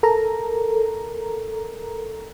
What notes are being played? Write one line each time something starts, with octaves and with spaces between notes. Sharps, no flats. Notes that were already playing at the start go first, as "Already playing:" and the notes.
A4 A#4 A#5